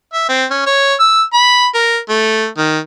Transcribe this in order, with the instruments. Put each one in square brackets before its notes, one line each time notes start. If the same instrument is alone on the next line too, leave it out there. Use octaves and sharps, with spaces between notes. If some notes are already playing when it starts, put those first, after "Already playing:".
[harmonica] E5
C4
C#4
C#5
E6
B5
A#4
A3
D#3